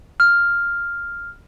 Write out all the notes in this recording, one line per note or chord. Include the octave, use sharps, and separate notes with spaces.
F6